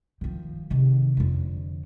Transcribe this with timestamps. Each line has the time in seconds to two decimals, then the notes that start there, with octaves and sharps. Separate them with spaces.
0.21 D#3 F3
0.70 C3 D#3
1.17 F2 D3